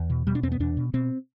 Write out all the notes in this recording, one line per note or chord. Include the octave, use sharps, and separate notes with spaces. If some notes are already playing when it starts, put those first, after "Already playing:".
Already playing: E2
B2
B2 G3
D4
E2 C4
B3
E2 D4
B2
B2 C4